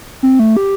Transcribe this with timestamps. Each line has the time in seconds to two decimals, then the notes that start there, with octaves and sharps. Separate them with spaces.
0.23 C4
0.39 A3
0.57 G4